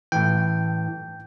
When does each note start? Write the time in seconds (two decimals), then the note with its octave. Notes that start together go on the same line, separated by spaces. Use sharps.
0.12 A2 E3 G5